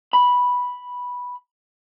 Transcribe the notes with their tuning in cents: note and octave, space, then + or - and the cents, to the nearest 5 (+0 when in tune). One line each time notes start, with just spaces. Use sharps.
B5 -5